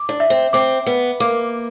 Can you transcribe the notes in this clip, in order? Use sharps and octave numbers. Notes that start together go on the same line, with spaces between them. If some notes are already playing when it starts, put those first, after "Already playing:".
Already playing: D6
D4
E5
C4
C4 D6
B3 B4
A#3 D6